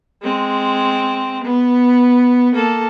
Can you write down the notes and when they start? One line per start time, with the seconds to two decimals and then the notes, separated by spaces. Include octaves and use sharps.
0.23 G#3 C4
1.44 B3
2.53 A#3 A4